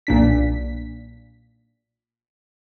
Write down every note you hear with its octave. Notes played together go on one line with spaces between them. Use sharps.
B1 A#2 D4 B6